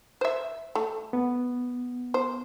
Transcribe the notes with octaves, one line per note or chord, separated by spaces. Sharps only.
C5 E5
A3
B3
C5